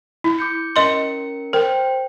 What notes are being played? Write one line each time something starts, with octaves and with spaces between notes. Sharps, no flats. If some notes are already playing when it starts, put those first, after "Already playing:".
E4
D6 G6 C#7
C#4 A#4 D#5 C6 C#7
A#4 C5 G5